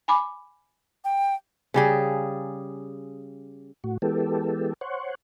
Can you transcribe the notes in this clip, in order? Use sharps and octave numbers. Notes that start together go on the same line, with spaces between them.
G#5 B5 D6
G5
C#3 G3 G#4
A2 F#4
E3 G#3 B3 G4 A4
C5 C#5 F#5